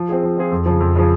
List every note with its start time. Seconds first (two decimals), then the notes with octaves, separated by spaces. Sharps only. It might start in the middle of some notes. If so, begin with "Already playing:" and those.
Already playing: F3
0.08 C4 F4 G#4
0.23 F3
0.38 C4 F4 G#4
0.52 F2
0.66 C#3 F3
0.80 F2
0.96 C#3 F3